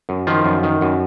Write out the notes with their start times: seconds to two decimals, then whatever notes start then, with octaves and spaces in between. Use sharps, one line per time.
0.09 F#2
0.27 D#3 F3 F4
0.45 F#2
0.63 D#3
0.81 F#2